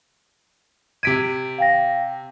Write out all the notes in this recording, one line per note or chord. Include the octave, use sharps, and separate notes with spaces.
C3 G#6 B6 D7 D#7
F5 G5 A#6